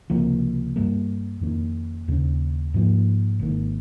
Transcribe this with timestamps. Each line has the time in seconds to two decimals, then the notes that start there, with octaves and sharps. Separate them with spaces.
0.10 C#2 C3 F3 A#3
0.76 G2 G3 A#3
1.41 F2 D#3 A#3 C#4
2.08 D#2 C#3 G#3 C#4
2.74 G#2 F3 A#3
3.39 G#1 G#2 D#3 A#3